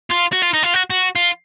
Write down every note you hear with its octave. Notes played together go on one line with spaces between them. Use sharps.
F4
F#4
F4
D#4
F4
F#4
F#4
F4